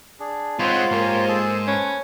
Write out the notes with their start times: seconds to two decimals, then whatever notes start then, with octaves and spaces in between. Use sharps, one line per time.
0.20 D4 G#4
0.59 G#3 C4 D#4 F4 C5 C#5 F#5 B5
0.91 G#2 A#3 G4 A#4 C5 C#5 G#5
1.28 G#4 A4 A5
1.68 A3 C#4 B4